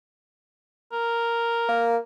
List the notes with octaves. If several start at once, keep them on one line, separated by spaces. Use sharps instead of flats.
A#4
A#3